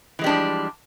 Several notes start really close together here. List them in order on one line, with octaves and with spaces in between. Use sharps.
E3 G#3 G3 D4 F3